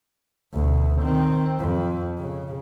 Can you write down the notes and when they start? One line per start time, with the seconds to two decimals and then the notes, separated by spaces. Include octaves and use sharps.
0.54 D2 B2
1.02 D#3 C4
1.59 F2
2.19 C#3